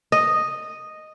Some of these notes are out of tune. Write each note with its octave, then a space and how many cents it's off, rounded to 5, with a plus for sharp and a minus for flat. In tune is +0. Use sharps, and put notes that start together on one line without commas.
D#5 -5